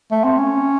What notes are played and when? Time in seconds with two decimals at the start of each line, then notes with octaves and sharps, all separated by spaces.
0.11 A3
0.24 C4
0.38 C#4